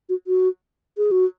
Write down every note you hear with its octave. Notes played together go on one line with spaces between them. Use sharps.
F#4
F#4
G#4
F#4